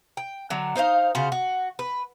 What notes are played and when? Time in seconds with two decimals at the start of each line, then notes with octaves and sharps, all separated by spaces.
0.17 G5
0.50 D3 F#3
0.76 D#4 C5 D#5 F5
1.15 C#3 F4 F#4 C5
1.32 F#4
1.79 B4